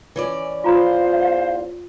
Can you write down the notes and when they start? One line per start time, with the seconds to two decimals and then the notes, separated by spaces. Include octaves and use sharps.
0.16 E3 C#4 D5
0.64 E2 F4 C5 F5 A#5 C6